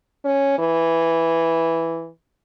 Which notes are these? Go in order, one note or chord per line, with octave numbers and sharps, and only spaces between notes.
C#4
E3